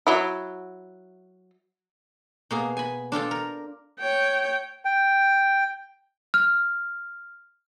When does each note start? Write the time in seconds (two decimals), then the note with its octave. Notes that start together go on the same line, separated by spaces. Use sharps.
0.07 F#3 E4
2.51 B2 A#3 G#4
2.77 G#5 B5
3.12 D4 F4 A4 G5
3.31 A#4
3.99 C#5 G5
4.85 G5
6.34 F6